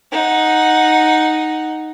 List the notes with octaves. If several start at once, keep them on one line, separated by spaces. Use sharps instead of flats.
D#4 F#5